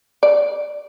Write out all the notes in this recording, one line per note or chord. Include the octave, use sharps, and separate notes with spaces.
D5